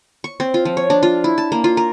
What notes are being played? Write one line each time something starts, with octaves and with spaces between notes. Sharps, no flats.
C#6
C4
F4
F3
C#5
D4
F4
E4
A5
A#3
F4
A#4